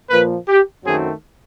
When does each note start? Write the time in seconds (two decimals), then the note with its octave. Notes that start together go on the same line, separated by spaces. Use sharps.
0.10 A#2 F3 A#3 B4
0.48 G4
0.84 F#2 D#3 F#3 A3 C4 G#4